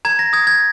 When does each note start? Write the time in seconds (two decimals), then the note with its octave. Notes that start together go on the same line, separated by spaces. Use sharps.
0.05 A#5 G#6
0.19 A#6
0.33 D#6 G#6
0.47 G#6